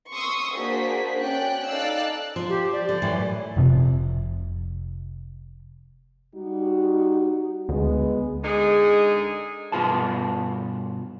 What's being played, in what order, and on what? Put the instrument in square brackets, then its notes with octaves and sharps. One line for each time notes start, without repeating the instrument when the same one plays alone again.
[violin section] C6 C#6 D#6 E6
A#3 D4 F#4 G#4 C5 B6
C#4 D5 G5 F#6
D#4 A4 D5 F5 E6 F#6
[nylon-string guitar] F3
[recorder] G4
D5
[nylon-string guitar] D3
F#2 A2 E3
[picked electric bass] F1 F2 C3 F3
[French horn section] G3 D#4 F#4
[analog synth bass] D2 [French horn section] G#3 B3
[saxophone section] D3 G#3 D#4 G#4
[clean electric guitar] G2 B2 F4 B4 A5